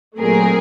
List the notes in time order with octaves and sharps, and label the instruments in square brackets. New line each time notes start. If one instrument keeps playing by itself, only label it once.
[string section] A#2 F#3 A3 C4 G#4 A#4